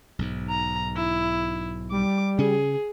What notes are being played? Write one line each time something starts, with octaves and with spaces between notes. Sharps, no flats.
B1 G#2
A#5
E4
G3 D6
C#3 C#4 G#4